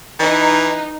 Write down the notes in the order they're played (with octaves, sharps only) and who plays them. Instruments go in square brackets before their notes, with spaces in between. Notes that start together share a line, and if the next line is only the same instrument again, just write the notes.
[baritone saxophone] E3 [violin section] D#4